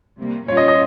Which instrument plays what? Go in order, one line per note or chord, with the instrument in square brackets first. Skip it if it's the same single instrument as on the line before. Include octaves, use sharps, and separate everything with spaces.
[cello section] C3 G3 A#3
[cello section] A#2 G3 C#4 F4 [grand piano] C#5
[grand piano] D#5
D#5